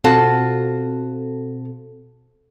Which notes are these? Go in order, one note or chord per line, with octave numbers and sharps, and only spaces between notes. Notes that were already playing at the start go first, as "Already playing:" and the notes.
B2 C4 F4 F#4 A4 A5